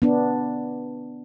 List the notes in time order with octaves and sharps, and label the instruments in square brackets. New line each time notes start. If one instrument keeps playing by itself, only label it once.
[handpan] B3 D4